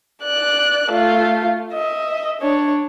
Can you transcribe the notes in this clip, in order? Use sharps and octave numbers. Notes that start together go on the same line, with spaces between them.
D5 F#6
A3 F4
D#5 E5
D4 C#5